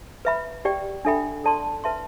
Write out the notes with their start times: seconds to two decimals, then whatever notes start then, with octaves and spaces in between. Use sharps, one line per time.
0.25 B4 E5 B5
0.65 G4 D5 G5
1.05 D4 A4 E5 G5 B5
1.44 A4 D5 A5 C6
1.84 B4 E5 A5 C6